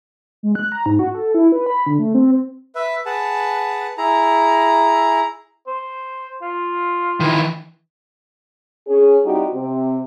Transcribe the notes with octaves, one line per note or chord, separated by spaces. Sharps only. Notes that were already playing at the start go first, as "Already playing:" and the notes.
G#3
F#6
A#5
G#2
F#4
A4
E4
B4
B5
D3
A3
C4
B4 E5
G#4 B4 F#5 A5
E4 G#4 A#5
C5
F4
D#3 E3
C#4 G#4
G3 C4 D#4 E4 F#4 G4
C3 C4